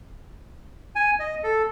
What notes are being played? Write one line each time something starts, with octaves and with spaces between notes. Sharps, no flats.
G#5
D#5
A4